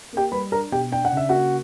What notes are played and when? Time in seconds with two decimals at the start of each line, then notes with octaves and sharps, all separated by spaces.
0.13 A#3 G4 G5
0.32 G3 B4 B5
0.52 D4 A#4 A#5
0.72 B2 G4 G5
0.92 D4 G5
1.05 F#5
1.12 C#3 E5
1.29 A#3 F#4 F#5